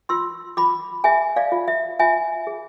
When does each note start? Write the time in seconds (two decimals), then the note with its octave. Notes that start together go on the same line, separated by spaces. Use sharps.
0.09 F4 C6 E6
0.57 F4 B5 D6
1.04 G#4 E5 G#5
1.36 D5 F5
1.52 F4
1.68 E5
1.99 F4 E5 G#5
2.47 G#4